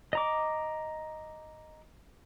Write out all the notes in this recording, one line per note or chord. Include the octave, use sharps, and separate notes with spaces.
D#5 A#5 D6